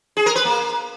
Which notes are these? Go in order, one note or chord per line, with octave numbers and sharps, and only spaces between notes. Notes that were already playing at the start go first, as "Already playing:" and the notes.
G#4
A#4
B4
A#3